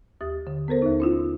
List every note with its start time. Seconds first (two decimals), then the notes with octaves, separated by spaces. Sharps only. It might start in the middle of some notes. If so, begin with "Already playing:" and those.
0.21 D#2 G4 D#6 A6
0.47 D3
0.68 B3 A4 A#4 C5
0.82 D#2 D#4
1.00 C#4 E4 F4